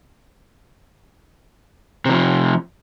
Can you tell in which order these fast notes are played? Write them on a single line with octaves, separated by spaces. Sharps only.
C3 E3 F3